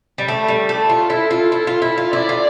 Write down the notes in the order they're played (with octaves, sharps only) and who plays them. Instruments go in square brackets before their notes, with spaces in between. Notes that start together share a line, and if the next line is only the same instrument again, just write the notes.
[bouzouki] G3
[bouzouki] A3 [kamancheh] A4
[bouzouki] G3
A3
F4
E4
F4
E4
F4
E4
F4
[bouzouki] E4 [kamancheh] D5
[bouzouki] F4